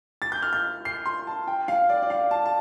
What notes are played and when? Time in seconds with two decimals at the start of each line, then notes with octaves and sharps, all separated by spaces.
0.22 A6
0.32 G6
0.42 F6
0.53 G6
0.85 C7
1.05 C6
1.27 A5
1.47 G5
1.68 F5
1.89 D5
2.02 D5
2.10 F5
2.31 A5
2.46 A5